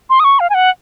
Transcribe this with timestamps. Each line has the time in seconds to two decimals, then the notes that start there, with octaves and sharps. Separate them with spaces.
0.10 C6
0.20 D#6
0.24 C#6
0.40 F5
0.50 G#5
0.54 F#5